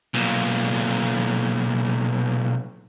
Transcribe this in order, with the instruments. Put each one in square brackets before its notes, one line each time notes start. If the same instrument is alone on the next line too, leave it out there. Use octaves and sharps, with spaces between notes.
[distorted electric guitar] B1 A#2